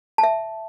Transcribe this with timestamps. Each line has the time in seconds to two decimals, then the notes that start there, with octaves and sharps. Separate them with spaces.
0.18 A5
0.23 E5